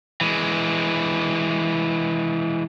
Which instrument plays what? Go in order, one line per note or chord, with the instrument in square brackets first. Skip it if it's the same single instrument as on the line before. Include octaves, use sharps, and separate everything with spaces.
[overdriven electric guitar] E3 G#3